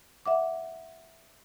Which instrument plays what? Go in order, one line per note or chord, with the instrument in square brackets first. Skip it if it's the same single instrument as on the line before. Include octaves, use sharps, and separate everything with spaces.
[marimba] E5 F#5 D6